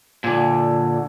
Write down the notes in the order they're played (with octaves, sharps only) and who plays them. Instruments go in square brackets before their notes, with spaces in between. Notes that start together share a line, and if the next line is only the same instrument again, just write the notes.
[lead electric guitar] A#2 D3